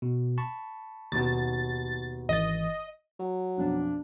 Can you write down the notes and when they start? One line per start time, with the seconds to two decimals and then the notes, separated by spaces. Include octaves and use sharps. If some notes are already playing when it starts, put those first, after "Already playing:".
0.02 B2
0.38 A5 B5 C#6
1.12 D#2 B2 A6
2.29 G#1 E3 D#5 A6
3.19 F#3
3.57 B1 F2 D4